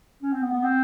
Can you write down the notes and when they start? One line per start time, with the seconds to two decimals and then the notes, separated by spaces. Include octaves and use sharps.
0.22 C#4
0.33 C4
0.42 B3
0.52 B3
0.63 C4